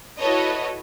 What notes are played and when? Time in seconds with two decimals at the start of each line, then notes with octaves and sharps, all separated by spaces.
0.19 E4 F#4 A4 B4 C#5 D#5